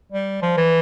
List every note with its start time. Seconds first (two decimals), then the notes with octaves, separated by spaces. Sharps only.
0.12 G3
0.42 F3
0.57 E3